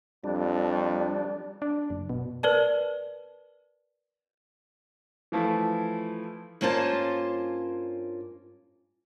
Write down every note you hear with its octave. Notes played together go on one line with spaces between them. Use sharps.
F2 G3 D4
D4
F#1
B2
A#4 B4 D5 A5
E3 F3 A3 E4
G2 A#3 C#4 F4 C5 A5